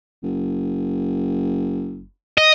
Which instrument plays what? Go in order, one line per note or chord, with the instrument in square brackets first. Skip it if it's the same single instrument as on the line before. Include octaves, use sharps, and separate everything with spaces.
[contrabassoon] F#1
[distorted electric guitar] D#5